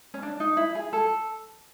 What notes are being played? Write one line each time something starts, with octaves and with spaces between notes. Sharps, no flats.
C#4
D4
D#4
E4
G#4
A4